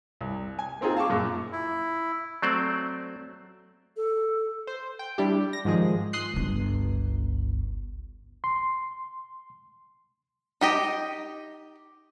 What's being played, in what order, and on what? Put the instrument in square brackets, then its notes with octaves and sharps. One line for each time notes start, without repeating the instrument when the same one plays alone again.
[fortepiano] C2
G#5
A#3 C4 D#4 F4 G#4
F5 A5 C#6 D6
F#2 A#2
[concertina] E4
[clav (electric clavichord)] F#3 A3 C4 C5 D5
[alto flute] A4
[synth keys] C5
G5
G3 D4 E4 G4
A#6
G#2 D#3 F3 G#3 G#4
C6 D#6 F#6 C7
[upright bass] G1 C#2
[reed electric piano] C6
[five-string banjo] D#4 G4 D#5